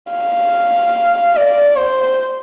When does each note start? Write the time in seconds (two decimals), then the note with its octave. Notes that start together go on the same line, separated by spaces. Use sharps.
0.10 F5
1.37 D5
1.78 C5